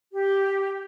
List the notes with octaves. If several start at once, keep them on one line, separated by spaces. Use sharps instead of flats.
G4